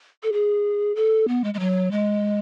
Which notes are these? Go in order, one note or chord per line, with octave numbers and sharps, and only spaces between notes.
A4
G#4
A4
B3
G#3
G#3
F#3
G#3